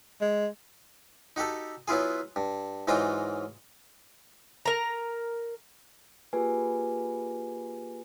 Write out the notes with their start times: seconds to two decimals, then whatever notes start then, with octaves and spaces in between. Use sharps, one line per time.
0.21 G#3
1.36 D#4 F#4 G4 A4
1.88 F#3 B3 E4 F4 G#4
2.36 G2
2.88 G#2 E3 F#3 F4 D#5 G5
4.66 A#4 A#5
6.33 A#3 F4 G4 G#4 B4 G#5